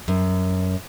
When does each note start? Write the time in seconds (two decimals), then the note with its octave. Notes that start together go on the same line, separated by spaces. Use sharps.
0.08 F#2